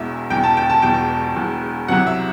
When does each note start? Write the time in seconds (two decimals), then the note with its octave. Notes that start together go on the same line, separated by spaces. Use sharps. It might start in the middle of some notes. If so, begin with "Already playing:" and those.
Already playing: E1 E2 B2 E5
0.30 E1 E2 B2 G5
0.44 A5
0.57 G5
0.70 A5
0.82 E1 E2 B2 G5
1.35 E1 E2 B2
1.88 C2 C3 F#3 F#5
2.07 E5